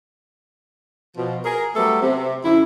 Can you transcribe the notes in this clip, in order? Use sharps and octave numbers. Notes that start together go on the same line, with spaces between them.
B2 F3
G#4 A#4
F#3 G3 A3 B3 A4
C3
F#2 D3 E4